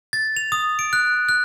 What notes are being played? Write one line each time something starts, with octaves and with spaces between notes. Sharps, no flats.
A6
F7
D#6
D7
F#6
F#6